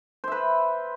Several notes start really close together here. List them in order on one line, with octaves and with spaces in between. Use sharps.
C5 E5 B4